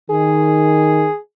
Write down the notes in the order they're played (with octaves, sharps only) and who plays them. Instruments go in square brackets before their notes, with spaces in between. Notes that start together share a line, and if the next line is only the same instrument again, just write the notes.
[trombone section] D#3 [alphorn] G#4